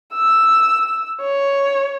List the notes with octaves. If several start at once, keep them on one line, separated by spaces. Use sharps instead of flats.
E6
C#5